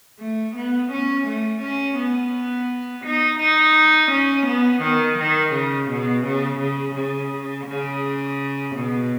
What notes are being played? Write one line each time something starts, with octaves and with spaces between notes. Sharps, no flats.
A3
B3
C#4
A3
C#4
B3
D#4
D#4
C#4
B3
D#3
D#3
C#3
B2
C#3
C#3
C#3
C#3
B2